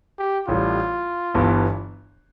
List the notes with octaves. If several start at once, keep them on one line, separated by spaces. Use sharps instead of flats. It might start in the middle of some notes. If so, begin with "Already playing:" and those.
G4
A1 A2 G3 F4
G1 G2 E3 B3